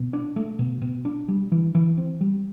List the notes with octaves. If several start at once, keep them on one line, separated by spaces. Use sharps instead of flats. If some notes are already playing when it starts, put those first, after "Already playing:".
Already playing: B2
D4
A3
B2
B2
D4
G3
E3
E3
C4
G3